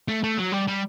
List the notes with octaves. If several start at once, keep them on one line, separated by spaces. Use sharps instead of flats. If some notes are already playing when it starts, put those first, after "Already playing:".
A3
A3
F#3
G3
G3